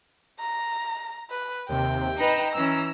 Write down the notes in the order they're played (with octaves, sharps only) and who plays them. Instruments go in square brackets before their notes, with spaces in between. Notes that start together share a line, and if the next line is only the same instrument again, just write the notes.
[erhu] A#5
B4
[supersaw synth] D#2 C3 [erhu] G5
[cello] D#4 B4 [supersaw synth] A#5 E7
[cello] E3 C#4 [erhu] E6